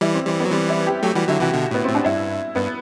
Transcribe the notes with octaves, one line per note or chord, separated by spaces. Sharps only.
E3 G3 E4
C4
E3 G3 C4
B3
F#3
E3 G3 C4
E4
G4
F#3 A3 G4
E3 G3 F#4
D3 F#3 E4
C3 E3 F#4
B2 D3
A2 B3
A2 C4
D4
G2 E4
G2 B3